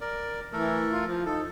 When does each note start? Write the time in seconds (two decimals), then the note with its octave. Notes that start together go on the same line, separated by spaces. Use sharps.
0.01 A#4 D5
0.53 E3 A3 A4 A#4
0.91 F4
1.06 F3
1.26 D#4 A4